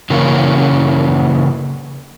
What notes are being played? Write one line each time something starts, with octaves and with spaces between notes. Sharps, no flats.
C#3 E3 A#3 C#4